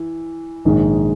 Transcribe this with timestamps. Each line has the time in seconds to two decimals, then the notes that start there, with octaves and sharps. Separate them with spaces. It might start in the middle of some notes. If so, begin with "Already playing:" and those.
Already playing: E3
0.65 A#1 G#2 D#3 G#3